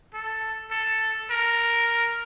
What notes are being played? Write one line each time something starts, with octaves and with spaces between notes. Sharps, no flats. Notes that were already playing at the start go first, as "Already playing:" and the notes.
A4
A4
A#4